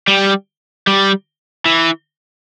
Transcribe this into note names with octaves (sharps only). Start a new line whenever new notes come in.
G3
G3
E3